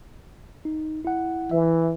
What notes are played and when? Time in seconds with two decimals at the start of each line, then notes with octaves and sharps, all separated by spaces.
0.65 D#4
1.05 E4 F#5
1.51 E3 E5